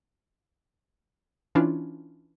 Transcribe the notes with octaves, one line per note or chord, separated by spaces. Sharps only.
E3 C#4 D4 E4 F4